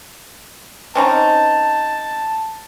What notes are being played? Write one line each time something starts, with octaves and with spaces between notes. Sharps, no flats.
C4 C#4 D#4 A5